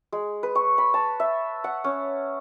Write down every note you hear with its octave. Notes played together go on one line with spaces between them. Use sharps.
G#3
B4
C#6
B5
A5
E5
F#5
C#4